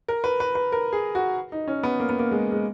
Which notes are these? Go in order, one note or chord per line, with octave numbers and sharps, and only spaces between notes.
A#4
B4
B4
B4
A#4
G#4
F#4
D#4
C#4
B3
A#3
B3
A#3
G#3
G#3